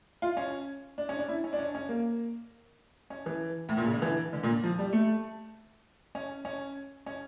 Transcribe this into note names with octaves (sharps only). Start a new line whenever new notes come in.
F4
C#4
D4
C#4
D4
E4
C#4
D4
C#4
C#4
A#3
C#4
E3
A2
A#2
C#3
D3
E3
D3
A#2
F3
G3
A3
C#4
C#4
C#4